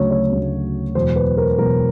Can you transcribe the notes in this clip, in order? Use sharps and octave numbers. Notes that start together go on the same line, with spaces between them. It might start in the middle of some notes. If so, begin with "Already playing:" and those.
Already playing: D2 C#3 F#3 C#5
C#5
D2 C#3 F#3
E1 E2 B2 F#3 C5
B4
A#4
E1 E2 B2 F#3 A#4